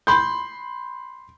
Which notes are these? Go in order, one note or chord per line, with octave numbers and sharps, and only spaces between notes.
B5 C6 G6